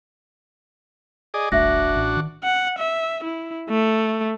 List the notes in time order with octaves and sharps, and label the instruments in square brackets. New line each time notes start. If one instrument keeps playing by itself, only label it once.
[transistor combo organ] G#4 D5 D#5
[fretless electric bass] D1 G1 A3 [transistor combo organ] D4 F#4 [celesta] E5 A#6
[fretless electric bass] A1
D#3
[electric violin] F#5
E5
E4
A3